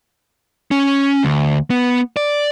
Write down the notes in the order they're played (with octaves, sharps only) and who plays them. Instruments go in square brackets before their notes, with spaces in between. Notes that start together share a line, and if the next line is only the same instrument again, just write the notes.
[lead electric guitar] C#4
D2
B3
D5